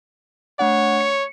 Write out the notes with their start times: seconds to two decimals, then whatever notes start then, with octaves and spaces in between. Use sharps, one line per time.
0.59 A3 D4 C#5 F#5
1.01 C#7